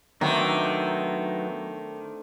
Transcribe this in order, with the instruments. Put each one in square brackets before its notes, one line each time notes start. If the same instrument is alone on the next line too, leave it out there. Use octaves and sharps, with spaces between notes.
[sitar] D#3 [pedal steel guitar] F#3 B3 D#4 [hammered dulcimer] A3 C4 D4